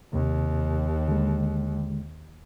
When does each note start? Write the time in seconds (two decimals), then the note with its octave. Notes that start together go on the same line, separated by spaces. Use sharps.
0.13 D#2 C3
1.09 D3 G#3